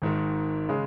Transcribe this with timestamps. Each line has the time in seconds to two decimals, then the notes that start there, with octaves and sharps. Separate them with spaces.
0.02 G#1 G#2 D#3
0.69 C#3 G#3